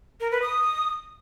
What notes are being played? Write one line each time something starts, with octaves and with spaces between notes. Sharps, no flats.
A#4
B4
D#6